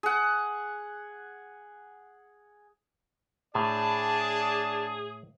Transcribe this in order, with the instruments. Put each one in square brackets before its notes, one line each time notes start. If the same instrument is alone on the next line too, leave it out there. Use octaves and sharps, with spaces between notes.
[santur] G#4 F#5
[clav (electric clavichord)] A2 [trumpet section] D4 D5 A5 [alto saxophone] G#4